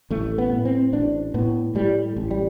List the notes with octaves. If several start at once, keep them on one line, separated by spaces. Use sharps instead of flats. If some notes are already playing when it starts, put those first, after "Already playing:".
A1 A3
B3
A2
C4
A1 D4
A2 B3
A2 G3
A1
G3